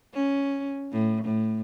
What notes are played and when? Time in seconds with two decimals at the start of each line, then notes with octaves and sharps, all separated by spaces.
0.14 C#4
0.92 A2
1.24 A2